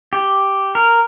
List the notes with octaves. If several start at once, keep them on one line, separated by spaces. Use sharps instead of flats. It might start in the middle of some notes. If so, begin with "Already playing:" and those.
G4
A#4